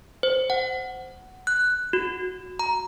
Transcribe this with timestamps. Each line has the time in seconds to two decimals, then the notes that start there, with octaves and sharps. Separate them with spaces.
0.23 C5
0.50 F#5
1.47 F#6
1.93 F#4
2.59 A#5